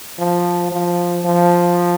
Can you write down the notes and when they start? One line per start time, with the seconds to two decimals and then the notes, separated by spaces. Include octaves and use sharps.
0.19 F3
0.72 F3
1.25 F3